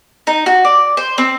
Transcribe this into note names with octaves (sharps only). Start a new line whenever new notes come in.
D#4
F#4
D5
C5
C4